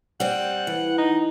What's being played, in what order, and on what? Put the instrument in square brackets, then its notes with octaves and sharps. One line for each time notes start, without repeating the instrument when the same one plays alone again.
[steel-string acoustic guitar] G3 C4 [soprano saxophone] F#5
[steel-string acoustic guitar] E3
[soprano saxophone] D#4